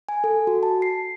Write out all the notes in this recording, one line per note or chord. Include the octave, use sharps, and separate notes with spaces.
G#5
A4
F#4
A5
C7